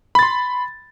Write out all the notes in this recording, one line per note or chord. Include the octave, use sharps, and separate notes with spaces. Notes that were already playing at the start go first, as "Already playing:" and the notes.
B5 C6 A6